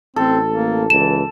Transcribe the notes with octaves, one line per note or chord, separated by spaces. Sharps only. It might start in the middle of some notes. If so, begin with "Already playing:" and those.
A1 C4 A4
A#3
C#2 E3 E7